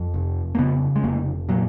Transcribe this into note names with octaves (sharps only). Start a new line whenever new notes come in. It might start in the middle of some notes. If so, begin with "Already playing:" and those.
Already playing: F2
F1
A#3
C#3 B3
G#3
F1 A#3
A#2 F#3